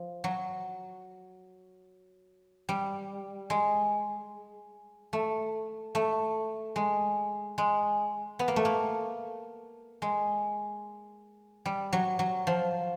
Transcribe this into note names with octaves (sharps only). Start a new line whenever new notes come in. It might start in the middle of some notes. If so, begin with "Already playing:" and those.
Already playing: F3
F#3
G3
G#3
A3
A3
G#3
G#3
B3
A#3
A3
A#3
G#3
G3
F#3
F#3
F3